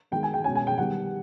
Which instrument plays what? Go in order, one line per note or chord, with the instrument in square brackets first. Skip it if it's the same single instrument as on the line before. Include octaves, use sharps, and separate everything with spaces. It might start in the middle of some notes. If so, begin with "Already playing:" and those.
[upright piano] D#3 G#3 B3 G5
G#5
G5
B2 G#3 C#4 G#5
G#5
G5
D#3 G3 B3 F#5